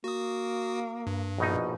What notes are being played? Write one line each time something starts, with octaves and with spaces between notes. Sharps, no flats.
A#3 F#4 D#6
G2
A#1 B2 D#4